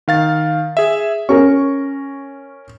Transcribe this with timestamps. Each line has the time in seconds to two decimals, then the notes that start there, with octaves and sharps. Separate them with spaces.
0.08 D#3 F5 A6
0.77 G#4 E5
1.29 C#4 A#4 C#6